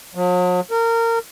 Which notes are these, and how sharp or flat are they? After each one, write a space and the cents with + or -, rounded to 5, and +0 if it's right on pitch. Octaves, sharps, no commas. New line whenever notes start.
F#3 -45
A#4 -25